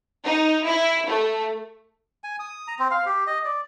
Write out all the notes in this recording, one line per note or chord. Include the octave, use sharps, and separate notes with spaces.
D#4
E4
A3
G#5
D#6
A#5
C4
F5
G4
D#5
D5